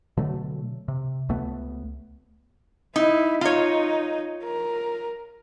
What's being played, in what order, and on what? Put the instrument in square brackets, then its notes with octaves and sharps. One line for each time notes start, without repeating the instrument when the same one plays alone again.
[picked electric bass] B2 D3 F#3 A3
C3
C#2 A3 B3
[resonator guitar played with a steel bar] D#4 [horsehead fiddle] E4
[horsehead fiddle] D#4 [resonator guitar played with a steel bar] F4 C#5
[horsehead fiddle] A#4